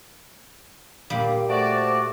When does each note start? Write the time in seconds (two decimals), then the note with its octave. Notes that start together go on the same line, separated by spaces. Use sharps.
1.10 A#2 G3 F5
1.49 A3 F#4 C5 D5 A5